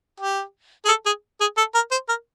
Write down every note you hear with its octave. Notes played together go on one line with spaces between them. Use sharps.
G4
G#4
A4
G#4
G#4
A4
A#4
C5
A#4